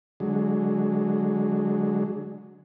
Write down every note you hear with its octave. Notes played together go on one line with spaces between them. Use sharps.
D3 F#3 G#3